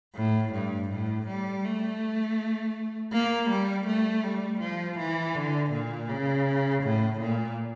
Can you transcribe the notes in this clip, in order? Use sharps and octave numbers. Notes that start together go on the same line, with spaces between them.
A2
G2
A2
G3
A3
A#3
G3
A3
G3
F3
E3
D3
A#2
C#3
A2
A#2